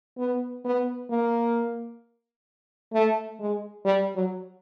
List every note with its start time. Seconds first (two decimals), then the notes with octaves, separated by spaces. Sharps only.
0.18 B3
0.65 B3
1.10 A#3
2.93 A3
3.40 G#3
3.85 G3
4.15 F#3